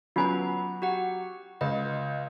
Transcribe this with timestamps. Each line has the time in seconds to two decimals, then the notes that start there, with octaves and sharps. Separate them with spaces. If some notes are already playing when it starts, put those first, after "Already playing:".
0.16 F#3 B3 C#4 F4 B4 G#5 A#5
0.82 F#4 G4 F#5
1.61 C#2 D#5